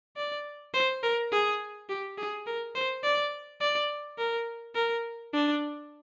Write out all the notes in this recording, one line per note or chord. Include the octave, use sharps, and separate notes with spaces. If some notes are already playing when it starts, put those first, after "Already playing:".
D5
C5
A#4
G#4
G4
G#4
A#4
C5
D5
D5
A#4
A#4
D4